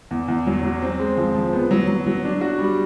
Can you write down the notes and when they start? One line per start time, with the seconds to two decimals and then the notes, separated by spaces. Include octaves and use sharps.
0.11 E2
0.28 E2
0.47 F#3
0.63 F#3
0.82 C4
0.99 G#3
1.17 F3
1.35 F3
1.53 B3
1.71 F#3
1.88 F#3
2.06 F#3
2.24 D4
2.41 F#4
2.59 G3